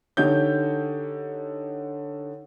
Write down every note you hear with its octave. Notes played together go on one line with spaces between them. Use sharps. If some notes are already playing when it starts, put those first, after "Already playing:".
D3 D#4 G4 C#5 G6